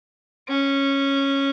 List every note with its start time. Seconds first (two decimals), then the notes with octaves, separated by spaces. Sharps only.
0.48 C#4